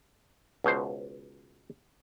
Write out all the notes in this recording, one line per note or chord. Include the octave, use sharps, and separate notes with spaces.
C#2 B2 C5